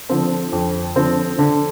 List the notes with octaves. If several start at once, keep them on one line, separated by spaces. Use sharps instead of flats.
D3 F3 C4
F2
D3 F3 C4
D3